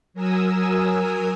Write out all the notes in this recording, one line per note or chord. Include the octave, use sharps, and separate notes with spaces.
F#3 A#4 G#5 D#6 E6